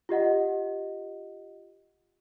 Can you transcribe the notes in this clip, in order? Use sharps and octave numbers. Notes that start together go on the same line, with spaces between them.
F4 G4 D#5 F#5